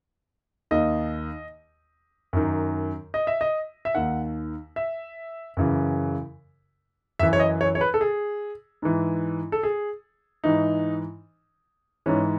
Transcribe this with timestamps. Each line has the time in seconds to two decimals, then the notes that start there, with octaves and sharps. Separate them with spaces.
0.71 D#2 D#3 D#5
2.33 F#2 D#3
3.14 D#5
3.27 E5
3.41 D#5
3.85 E5
3.95 D#2 D#3 F#5
4.76 E5
5.57 F#2 C#3 E3
7.19 F#2 E5
7.23 E3
7.33 C#5
7.40 D#5
7.61 C#5
7.75 C#5
7.81 B4
7.94 A4
8.01 G#4
8.82 G#2 E3
9.52 A4
9.63 G#4
10.44 G#2 E3 D#4
12.06 G#2 E3 C#4